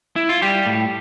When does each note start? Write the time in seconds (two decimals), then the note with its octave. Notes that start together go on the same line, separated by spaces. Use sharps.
0.16 E4
0.29 F4
0.42 G3 G4
0.66 A2